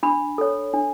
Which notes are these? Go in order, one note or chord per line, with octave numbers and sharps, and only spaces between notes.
D4 B5
A4 C#5
D4